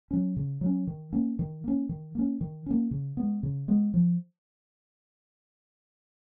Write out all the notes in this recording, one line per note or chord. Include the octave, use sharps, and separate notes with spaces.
F#3 C#4
C#3
F#3
C#4
D#3
A#3 C#4
D#3
A#3 C#4
D#3
A#3 C#4
D#3
A#3 C#4
C#3
G#3 B3
C#3
G#3 B3
F3